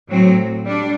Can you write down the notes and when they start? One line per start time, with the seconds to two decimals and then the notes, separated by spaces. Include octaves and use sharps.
0.08 A2 F#3 C4
0.65 G3 D4